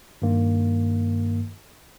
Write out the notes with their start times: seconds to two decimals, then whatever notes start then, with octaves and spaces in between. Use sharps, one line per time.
0.22 G2 D#3 A#3